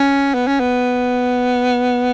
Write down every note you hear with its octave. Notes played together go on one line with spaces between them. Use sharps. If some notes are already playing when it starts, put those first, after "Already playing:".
Already playing: C#4
B3
C#4
B3